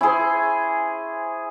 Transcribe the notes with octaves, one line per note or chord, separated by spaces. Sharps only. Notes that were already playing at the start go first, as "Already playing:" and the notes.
C#4 E4 G#4 C5